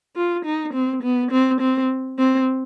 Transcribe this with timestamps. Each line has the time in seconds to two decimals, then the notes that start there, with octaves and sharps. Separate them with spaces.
0.16 F4
0.45 D#4
0.73 C4
1.03 B3
1.31 C4
1.61 C4
2.19 C4